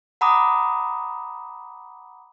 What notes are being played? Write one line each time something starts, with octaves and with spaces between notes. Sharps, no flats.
F#5 G#5 A#5 B5 D6 D#6